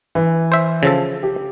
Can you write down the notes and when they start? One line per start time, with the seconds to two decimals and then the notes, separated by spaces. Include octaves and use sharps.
0.15 E3
0.52 C5 E5
0.83 C#3 F3 A4
1.23 G4